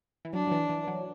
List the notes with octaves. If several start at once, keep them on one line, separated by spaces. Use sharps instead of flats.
E3
F#3 D4
F#3
E3
E3
F#3